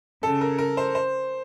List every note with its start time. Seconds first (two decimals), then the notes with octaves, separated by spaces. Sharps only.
0.23 C#3 A4
0.41 A#4
0.58 A#4
0.77 C5
0.95 C5